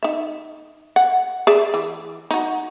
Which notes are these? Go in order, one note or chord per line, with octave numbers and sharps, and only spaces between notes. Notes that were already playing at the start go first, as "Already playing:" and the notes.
D#4 E5
F#5
G#4 D5 E5
E3
D#4 F#4